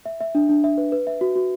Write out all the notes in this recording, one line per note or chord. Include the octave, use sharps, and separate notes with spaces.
E5
E5
D4
D4
E5
B4
B4
E5
F#4
F#4